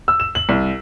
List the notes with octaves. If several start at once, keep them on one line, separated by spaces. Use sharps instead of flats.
E6
E7
F#7
C2